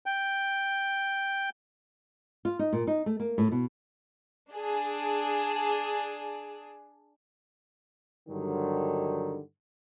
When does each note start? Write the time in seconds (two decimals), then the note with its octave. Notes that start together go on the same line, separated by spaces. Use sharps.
0.06 G5
2.45 F4
2.59 D#4
2.73 A#2
2.87 D#4
3.06 A3
3.20 A#3
3.38 A2
3.52 B2
4.50 D4 G#4
8.29 G2 D3 D#3 F#3